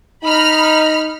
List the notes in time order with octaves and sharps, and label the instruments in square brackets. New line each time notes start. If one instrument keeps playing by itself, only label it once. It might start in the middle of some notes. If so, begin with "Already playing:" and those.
[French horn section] D#4 [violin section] B5 F6